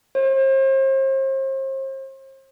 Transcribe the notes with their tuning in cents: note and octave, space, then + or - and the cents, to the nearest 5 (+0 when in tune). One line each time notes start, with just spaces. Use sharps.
C5 +40